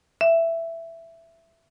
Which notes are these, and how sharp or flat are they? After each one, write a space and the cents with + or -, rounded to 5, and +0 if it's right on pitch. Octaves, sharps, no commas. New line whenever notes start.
E5 +10